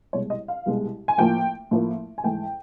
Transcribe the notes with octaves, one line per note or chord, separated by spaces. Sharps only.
C2 B2 G#3 C#5
D#5
F5
C2 B2 G#3
G#5
A2 F3 A#3 G5
A2 F3 A#3
G#5
G#2 E3 A3 G5